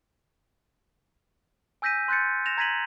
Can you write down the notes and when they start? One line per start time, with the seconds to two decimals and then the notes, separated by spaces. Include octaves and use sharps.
1.82 G#5 E6 G6 A#6 B6 D#7
2.08 C6 F#6 G6 A6 C#7
2.46 A#6 E7 F7
2.58 A#5 G#6 A#6 B6 D#7 F#7